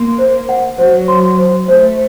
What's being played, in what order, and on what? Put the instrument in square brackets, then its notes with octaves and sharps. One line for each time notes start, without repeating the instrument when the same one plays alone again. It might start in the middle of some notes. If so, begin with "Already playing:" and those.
Already playing: [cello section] A#3 [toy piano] C6
[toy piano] C5
F#5
[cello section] F#3 [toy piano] C5
[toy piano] C6
C5
[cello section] A3 [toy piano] C5